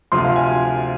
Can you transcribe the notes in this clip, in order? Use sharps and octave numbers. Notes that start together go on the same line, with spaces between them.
D2 C3 F3 C6
F5
G#5